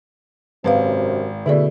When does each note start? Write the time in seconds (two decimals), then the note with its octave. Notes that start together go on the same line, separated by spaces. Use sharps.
0.64 G#1 F#2 C3 C4 B4 F5
1.46 B2 D3 A3 E4 G#4 D5